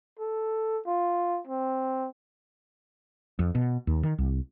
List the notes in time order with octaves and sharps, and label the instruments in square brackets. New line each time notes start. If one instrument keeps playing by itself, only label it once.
[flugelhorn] A4
F4
C4
[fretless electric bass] F2
B2
D#2
D#3
C2